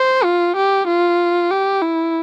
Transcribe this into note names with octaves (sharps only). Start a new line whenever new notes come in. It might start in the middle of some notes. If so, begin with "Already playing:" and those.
Already playing: C5
F4
G4
F4
G4
E4